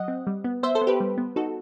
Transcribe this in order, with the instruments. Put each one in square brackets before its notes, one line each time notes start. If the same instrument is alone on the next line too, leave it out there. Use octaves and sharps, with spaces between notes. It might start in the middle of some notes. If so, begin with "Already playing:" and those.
Already playing: [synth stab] F#3 D#5 F#5
C4
G3
B3
B3 C5 E5
A4 C5
B3
G4 B4
G3
B3
D#4 F#4 A4